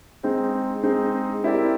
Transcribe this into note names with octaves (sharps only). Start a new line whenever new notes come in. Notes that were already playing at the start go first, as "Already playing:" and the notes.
G#3 C4 D#4
G#3 C4 D#4
C4 E4 G4 A#4 D5